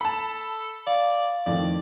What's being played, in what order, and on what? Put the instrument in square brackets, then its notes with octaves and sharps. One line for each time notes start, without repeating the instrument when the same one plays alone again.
[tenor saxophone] A4 [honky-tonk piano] A5 B5
[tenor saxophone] D5 [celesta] F5
[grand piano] F2 A2 D#3 [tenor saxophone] D5